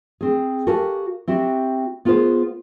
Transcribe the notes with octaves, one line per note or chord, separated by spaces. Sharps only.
C4 G#4
F#4 G4 A4 A#4 F5 G#5
C4 E4 F#4 G4
B3 F4 G#4 A#4 C5